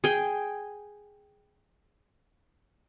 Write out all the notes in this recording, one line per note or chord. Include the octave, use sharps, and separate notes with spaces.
G#4 G5